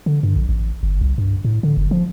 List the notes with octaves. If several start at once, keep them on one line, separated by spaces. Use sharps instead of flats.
D3
G2
A#1
A1
G1
C2
G2
A2
D3
F#1
F3